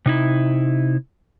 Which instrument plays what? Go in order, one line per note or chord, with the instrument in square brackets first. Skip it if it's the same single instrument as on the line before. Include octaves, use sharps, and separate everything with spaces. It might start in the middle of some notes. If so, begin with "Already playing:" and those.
[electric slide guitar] C3 D#4 E4